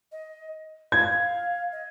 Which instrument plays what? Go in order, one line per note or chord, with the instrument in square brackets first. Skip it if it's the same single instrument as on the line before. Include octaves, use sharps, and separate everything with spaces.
[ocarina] D#5
[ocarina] F5 [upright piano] G#6
[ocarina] D#5